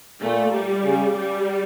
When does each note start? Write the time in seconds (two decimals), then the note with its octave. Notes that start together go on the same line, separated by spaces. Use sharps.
0.21 A#2 A3
0.53 G3
0.84 C#3
1.16 G3